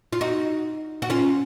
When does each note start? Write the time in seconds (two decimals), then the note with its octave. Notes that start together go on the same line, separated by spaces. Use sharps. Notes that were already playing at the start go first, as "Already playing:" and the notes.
0.13 F4
0.21 D#4 F#4
1.02 F#4
1.10 C#4 F4